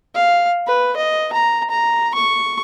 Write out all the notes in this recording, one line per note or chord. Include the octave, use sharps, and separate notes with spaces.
F5
B4
D#5
A#5
A#5
C#6